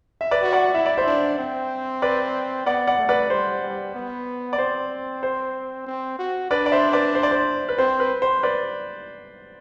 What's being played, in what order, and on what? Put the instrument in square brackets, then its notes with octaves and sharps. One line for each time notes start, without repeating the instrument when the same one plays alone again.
[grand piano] E5
B4 D5
[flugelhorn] F#4
[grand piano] D5 F#5
[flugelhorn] E4 [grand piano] E5
[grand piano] D5
C5 E5
[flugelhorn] D4
C4
[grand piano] B4 D5
[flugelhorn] B3 [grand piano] D5 F#5
[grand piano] D5 F#5
[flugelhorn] A3
[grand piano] B4 D5
[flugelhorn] G3 [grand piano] C5
[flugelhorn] G3
B3
[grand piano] D5
[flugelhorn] C4 [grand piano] C5
[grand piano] C5
[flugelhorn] C4
F#4
[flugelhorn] D4 [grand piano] B4 D5
[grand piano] D5
C5 E5
B4 D5
C5
D5
C5
B4
[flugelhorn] C4 [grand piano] C5
[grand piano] B4
C5
B4 D5